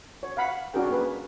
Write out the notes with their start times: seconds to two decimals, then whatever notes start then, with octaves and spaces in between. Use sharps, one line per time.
0.23 C#5
0.37 F5 F#5 B5
0.74 C#4 D4 F#4 G#4 A#4 G5
0.91 A#3 G#4 B4